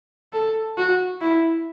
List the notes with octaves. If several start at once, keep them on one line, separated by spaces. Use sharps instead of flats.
A4
F#4
E4